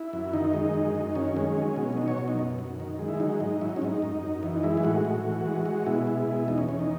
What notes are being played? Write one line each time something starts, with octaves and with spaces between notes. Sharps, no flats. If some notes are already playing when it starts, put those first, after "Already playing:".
Already playing: E4
F#2
D#3 D#4
G#3
F#2
F#2
D#3 C#4
G#3
F#3
B2
C#4
F#3 D#4
C#5
B2
D#4
F#2
F#2
D#3
G#3
E4
F#3 D#4
G#2 D#4
F#3 E4
D#4
C#4
G#2 D#4
F#2
F#2
E3 D#4
G#3 E4
E4
A2 F#4
A2
E3
G#3
G#3 F#4
B2 E4
G#3
B2
E2 D#4
C#4
E2 C#4
D#4